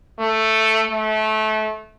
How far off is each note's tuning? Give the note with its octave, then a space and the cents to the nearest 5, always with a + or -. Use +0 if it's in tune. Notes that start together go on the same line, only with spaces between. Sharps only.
A3 +5
A3 -25